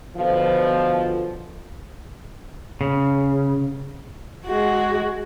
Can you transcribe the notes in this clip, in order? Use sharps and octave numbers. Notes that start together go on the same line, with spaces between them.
B2 D3 F3
C#3
G#3 F#4